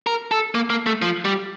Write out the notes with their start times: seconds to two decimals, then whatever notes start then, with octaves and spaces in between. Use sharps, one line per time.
0.07 A#4
0.31 A4
0.55 A#3
0.70 A#3
0.86 A3
1.02 F3
1.25 G3